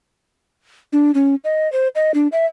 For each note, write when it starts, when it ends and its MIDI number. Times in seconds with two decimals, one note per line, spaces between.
0.93 1.11 62
1.14 1.35 61
1.44 1.70 75
1.72 1.88 72
1.95 2.12 75
2.14 2.28 62
2.32 2.46 76